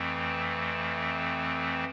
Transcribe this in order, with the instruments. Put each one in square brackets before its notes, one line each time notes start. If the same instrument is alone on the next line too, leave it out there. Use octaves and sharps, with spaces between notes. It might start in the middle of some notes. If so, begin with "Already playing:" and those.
Already playing: [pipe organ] F2 E3 A3 C4